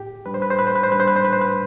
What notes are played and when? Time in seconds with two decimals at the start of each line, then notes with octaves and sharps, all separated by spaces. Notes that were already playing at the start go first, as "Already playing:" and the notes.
Already playing: A2 G4
0.26 G3 D4 B4
0.34 C5
0.42 B4
0.50 C5
0.59 A2 B4
0.67 C5
0.76 B4
0.83 C5
0.92 G3 D4 B4
1.00 C5
1.08 B4
1.16 C5
1.24 A2 B4
1.33 C5
1.41 B4